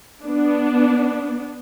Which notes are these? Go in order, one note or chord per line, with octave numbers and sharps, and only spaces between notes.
B3 D4